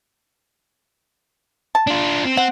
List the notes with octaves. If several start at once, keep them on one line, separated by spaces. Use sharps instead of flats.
A5
D4 F4
C4
C4 F#5